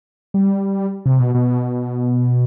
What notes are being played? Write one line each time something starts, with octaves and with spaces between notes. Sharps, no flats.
G3
C3
B2
B2